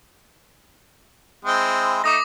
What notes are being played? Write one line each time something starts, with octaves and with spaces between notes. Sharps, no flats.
G#3 C4 E4
A3 D#4 D6 D#6 A#6